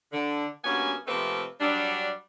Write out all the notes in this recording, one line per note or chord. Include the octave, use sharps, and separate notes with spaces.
D3
G2 A#3 B3 C#4 F#4 G#5
C3 F3 A3 A#3 C4 B4
F#3 G3 D4